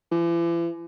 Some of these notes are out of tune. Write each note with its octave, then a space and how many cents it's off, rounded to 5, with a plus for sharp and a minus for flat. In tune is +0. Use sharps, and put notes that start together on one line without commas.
E3 +45